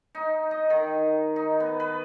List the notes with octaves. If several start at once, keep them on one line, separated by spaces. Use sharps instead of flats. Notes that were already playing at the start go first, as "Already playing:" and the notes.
D#4
D#5
D#3
D#4
B3
B4